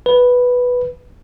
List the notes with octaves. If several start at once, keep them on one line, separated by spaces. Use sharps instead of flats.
B4